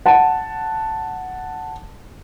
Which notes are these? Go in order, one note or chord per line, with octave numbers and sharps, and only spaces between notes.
F#5 A5